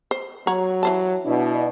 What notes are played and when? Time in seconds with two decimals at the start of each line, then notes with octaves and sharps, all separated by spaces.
0.11 C5
0.47 F#3 C#5 F#5 A#5
0.83 E3 C5 A5
1.26 B2 D4 E4